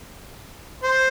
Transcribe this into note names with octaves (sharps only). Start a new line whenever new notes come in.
C5